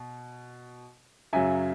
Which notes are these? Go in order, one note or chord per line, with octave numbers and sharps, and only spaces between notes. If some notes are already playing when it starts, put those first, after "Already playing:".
Already playing: B2
F#2 C#3 F#3 E5 G#5